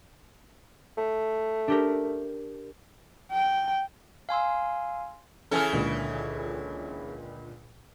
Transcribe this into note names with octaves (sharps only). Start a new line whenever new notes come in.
A3
D4 G4 A#4
G5
F5 G#5 C6 E6
C#3 E3 C#4 A4 G#5 F6
C#2 A#2 D3